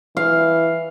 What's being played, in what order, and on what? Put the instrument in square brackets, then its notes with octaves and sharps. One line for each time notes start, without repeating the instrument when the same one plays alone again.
[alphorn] E3 [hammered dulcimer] F5